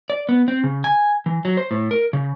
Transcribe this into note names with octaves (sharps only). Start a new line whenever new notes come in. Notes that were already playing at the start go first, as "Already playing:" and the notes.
D5
B3
C4
C#3
G#5
E3
F#3
C5
A2
A#4
C#3